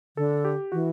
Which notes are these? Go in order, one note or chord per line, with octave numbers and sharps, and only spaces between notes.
D3 A4
G4
E3 F#4